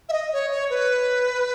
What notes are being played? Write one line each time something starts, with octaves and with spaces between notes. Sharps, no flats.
E5
D#5
C#5
C#5
B4